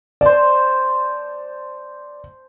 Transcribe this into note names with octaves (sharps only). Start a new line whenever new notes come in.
C5 D5 A5